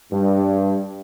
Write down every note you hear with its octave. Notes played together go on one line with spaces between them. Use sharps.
G2